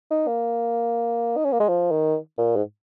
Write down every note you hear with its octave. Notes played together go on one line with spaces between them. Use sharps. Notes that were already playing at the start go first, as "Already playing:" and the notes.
D#4
A#3
D#4
C#4
A#3
G#3
F3
D#3
A#2
G#2